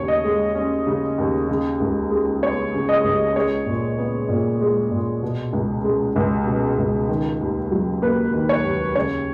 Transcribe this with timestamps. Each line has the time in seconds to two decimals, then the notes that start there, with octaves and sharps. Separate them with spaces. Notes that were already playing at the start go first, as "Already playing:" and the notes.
Already playing: D#2 C#3 C#5
0.08 D#5
0.24 G#3
0.55 C#4
0.87 C#3
1.18 D#2
1.49 C#3
1.80 C#2
2.11 G#3
2.42 B3 C#5
2.74 C#3
2.89 D#5
3.04 C#2
3.36 G#3 C#5
3.66 A#2
3.99 B3
4.29 A#2
4.61 G#3
4.91 A#2
5.23 B2
5.53 C#2
5.84 G#3
6.16 C#2
6.47 B2
6.78 C#2
7.09 D#3
7.41 D#2
7.71 F#3
8.02 A#3 B4
8.33 D#3
8.49 C#5
8.64 D#2
8.96 C#3 C#5